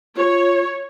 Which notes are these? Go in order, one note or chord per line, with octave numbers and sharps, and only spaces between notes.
F4 C#5